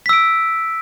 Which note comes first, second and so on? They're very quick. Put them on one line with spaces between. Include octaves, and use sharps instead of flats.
B6 E6 D7